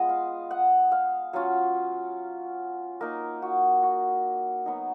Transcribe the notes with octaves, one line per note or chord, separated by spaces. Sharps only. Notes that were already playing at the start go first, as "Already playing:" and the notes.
Already playing: G#3 B3 F4 D#5
F5
F#5
F5
F#3 C#4 F4 F5
A#3 D#4 A#4
F#4
F#4
F#3 B3 D#4